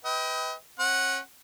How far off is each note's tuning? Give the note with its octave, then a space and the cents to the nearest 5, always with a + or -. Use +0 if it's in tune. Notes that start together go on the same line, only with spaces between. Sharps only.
B4 +15 D#5 +35 G5 +0
C#4 -35 F#5 +0